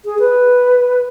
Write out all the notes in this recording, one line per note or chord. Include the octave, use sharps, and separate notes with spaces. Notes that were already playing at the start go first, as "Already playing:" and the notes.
G#4
B4